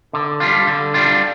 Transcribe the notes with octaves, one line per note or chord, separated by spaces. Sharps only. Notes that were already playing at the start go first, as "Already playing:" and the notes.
D3
G3 D4 F4
D3
G3 D4 F4